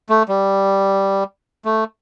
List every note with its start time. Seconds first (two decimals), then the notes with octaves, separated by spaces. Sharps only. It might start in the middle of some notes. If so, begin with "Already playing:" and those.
0.09 A3
0.28 G3
1.65 A3